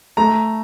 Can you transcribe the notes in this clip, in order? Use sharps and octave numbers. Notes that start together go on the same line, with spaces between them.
A3 A#5